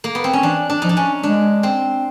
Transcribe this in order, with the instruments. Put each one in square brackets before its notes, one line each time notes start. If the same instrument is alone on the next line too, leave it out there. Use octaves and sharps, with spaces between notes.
[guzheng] A#3
B3
C4
C#4
[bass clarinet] E3 [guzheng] D4
[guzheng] D4
[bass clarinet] F3 [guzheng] D#4
[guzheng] D4
C#4
[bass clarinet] G#3 [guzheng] D4
[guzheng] C4